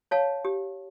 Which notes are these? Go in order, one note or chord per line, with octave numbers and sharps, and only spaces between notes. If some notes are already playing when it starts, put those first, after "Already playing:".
C#5 F5 A5
G4